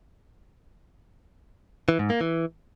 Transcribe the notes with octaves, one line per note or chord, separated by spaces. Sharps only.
E3
G#2
A#3
E3